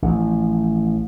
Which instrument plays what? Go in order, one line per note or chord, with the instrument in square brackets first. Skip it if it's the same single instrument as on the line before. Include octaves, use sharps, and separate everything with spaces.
[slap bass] A1 F3